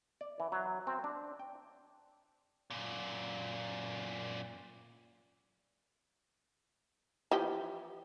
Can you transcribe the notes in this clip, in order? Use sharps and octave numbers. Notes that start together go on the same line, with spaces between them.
D5
E3
F#3
C4
D4
G5
F#2 A#2
E3 F3 G4